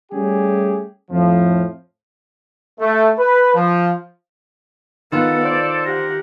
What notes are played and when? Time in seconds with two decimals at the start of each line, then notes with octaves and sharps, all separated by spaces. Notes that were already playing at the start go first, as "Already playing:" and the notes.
0.12 G3 A3 C#4 G4 G#4
1.11 F2 A2 F3
2.80 A3
3.19 B4
3.55 F3
5.12 D#3 B3 F4 A4 F#5
5.45 C5 D5
5.85 G4 A#4 F#5